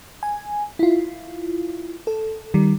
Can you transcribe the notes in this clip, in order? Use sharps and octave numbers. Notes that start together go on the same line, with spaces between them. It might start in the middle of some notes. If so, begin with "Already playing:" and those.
G#5
E4 F4
A4
D#3 G3